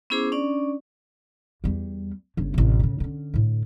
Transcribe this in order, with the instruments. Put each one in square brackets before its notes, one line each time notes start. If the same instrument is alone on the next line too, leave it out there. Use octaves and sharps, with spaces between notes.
[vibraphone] B3 C#4 E4 G#4 C5 D6
C#4 D4 D5
[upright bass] E2 G3
G1 C#3
A1 C3
A2 C#3
D3 C#4
A2 D3